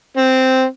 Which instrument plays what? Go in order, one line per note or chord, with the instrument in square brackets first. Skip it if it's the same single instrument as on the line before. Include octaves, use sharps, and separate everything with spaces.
[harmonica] C4